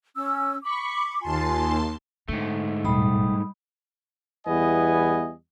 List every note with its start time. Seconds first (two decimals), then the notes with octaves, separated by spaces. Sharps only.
0.16 C#4 E6
0.63 B5 C#6 D6
1.21 D#2 F4 G#5 A5 C6
2.28 G#2 D3 A3
2.84 E1 A2 G3 B5 D#6
4.47 E2 G3 B3 E4 D#5 G#5